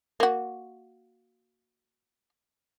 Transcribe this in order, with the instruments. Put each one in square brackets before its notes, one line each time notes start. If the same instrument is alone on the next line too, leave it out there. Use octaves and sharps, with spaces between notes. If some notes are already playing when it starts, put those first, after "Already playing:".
[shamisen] A#3 F#4